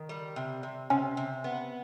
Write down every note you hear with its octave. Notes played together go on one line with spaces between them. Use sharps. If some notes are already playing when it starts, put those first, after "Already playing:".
Already playing: D#3
G3
C3
C3
C3 C#4
C3
B3